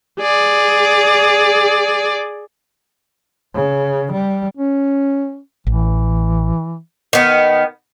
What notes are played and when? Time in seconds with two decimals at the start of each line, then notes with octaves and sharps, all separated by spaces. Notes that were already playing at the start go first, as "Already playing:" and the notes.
0.20 G#4 D5
3.55 C#3
4.12 G3
4.57 C#4
5.67 A1 E3
7.13 D#3 B3